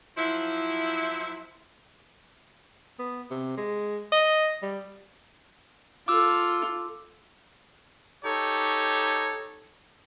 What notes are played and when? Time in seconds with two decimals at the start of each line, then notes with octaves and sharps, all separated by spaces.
0.17 F3 F#3 E4
2.99 B3
3.31 C3
3.57 G#3
4.12 D#5
4.62 G3
6.08 F4 A4 D6 E6
8.24 D#4 G4 A4 C#5